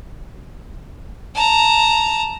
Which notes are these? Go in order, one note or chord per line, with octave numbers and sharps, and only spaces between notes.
A5 A#5